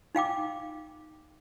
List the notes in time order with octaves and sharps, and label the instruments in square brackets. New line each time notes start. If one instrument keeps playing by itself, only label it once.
[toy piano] D#4 F5 G5 D6